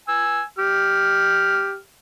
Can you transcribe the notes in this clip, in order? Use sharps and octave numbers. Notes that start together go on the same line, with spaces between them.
G#5 E6
G4 F6